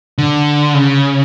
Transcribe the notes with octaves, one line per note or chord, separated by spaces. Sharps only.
D3
C#3